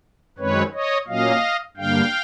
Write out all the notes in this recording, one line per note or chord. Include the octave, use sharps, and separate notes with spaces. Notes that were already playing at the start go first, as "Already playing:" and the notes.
F#2 D#3 G#3 C4 B4 C#5
C#5 D#5
A#2 F#3 A#3 C#4 D#5 F5
G2 D3 G3 A#3 F5 G5